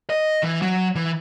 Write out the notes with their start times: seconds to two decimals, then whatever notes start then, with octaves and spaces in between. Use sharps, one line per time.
0.10 D#5
0.43 E3
0.62 F#3
0.96 E3